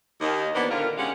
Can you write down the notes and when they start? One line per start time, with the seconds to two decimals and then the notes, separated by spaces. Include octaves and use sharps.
0.21 D#2 D#5
0.54 E3 A#3 B3 D4 C5 D5
0.70 A#2 D3 D#3 F4 A#4
0.97 C3 G#3 C#4 G4 F5 F#5